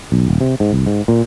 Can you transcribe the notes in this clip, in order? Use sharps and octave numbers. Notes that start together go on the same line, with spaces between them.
B1
D#1
C3
G#2
C2
G#2
A#2